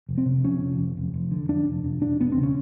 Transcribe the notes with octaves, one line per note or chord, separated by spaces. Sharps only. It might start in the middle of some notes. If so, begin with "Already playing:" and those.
F1
C4
C3
F2 C#4
F1
F1
F1
F1
D3
F2 D4
F1
F1
E1 D4
E1 B3
C4
C#3
C#4